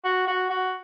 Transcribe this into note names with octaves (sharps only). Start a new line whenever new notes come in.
F#4
F#4
F#4